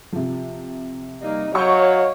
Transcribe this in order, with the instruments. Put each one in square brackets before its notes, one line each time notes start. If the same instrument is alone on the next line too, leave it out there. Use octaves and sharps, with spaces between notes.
[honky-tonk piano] C3 F3
[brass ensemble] G3 A#3 [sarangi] D#4
[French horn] F#3 [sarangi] C#5 [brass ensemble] D#5 F5 [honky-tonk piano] C#6 G6